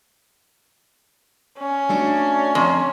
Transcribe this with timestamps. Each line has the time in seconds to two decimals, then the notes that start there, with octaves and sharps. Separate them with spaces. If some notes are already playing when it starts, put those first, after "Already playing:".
1.58 C#4
1.89 A3 D4 F#4
2.55 F2